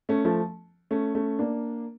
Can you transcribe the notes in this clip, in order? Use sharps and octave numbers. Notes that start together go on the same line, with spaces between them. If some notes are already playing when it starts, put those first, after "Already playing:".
A3 C#4
F3 A3
A3 C#4
A3 C#4
A#3 D4